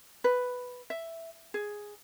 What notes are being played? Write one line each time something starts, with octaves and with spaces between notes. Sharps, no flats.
B4
E5
G#4